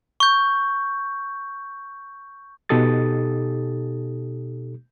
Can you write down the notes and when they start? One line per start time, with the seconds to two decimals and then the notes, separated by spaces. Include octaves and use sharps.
0.20 C#6 G6
2.69 B2 D#4 G4 A4 D#6 A6